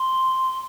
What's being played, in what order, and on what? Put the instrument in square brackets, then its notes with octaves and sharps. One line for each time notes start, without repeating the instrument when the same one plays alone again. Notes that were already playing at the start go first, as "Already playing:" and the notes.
Already playing: [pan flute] C6